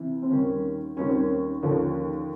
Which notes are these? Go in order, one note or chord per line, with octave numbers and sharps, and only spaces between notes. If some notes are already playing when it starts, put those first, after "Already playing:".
Already playing: C3 E3
C4
D#2 D#3 G3 C#4
D#2 D#3 G3 C#4
C4
C#4
D#2 D3 F3 C#4